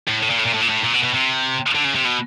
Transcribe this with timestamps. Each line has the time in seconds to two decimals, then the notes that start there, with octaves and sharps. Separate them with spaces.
0.08 A2
0.23 A2
0.31 A#2
0.39 A2
0.46 A#2
0.54 A2
0.62 A#2
0.70 A2
0.84 A#2
0.94 B2
1.04 B2
1.14 C3
1.75 D3
1.85 C#3
1.95 C3
2.05 B2